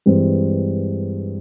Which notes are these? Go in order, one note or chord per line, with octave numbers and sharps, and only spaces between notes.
G2 E3 G#3 C4